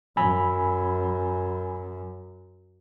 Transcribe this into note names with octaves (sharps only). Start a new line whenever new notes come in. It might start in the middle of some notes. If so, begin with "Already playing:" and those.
F#2 G#5 B5 E6